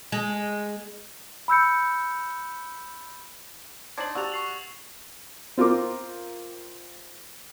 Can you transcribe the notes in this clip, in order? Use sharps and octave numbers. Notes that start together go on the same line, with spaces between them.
G#3
B5 E6 G6 C#7
C4 D4 D#4 G#6 A6 F#7
F#4 G4 D5 A5 E6 F7
C#6 C7 F#7
C4 F4 A#4 D6